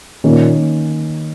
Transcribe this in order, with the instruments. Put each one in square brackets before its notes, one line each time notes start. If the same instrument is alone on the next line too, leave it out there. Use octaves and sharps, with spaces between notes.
[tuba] A#2 [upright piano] D#3 A#3 C#4